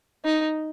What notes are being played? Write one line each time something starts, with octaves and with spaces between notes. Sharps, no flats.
D#4